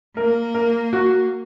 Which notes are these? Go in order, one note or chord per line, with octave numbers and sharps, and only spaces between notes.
A#3 A#4
A#4
F#4